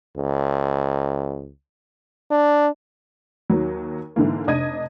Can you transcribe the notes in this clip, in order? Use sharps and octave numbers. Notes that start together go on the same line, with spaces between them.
C#2
D4
D#2 F#3
G#2 D3 E3 A#3
F1 D4 D#5 G#6 D#7